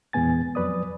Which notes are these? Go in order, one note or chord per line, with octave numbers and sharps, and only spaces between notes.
E2 A#2 G#3 B3 G#5 A6
F2 F#3 B4 D5 D#6